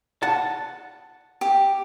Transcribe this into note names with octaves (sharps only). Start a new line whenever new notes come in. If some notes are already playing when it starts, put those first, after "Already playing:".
F#5 A5
G4